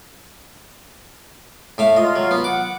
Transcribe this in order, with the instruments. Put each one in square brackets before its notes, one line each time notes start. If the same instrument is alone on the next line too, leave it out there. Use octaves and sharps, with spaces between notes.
[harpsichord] A2 E5 F5
[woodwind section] F4 [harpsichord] D#5
[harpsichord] F#3
B3
[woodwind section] F#5 [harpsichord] D6